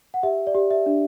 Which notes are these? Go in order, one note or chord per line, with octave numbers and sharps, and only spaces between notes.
F#5
G4 E5
D5
G4
E5
D4